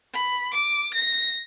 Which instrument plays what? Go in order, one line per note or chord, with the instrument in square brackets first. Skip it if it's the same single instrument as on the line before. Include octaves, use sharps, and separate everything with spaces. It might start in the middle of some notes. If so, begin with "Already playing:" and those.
[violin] B5
D6
A#6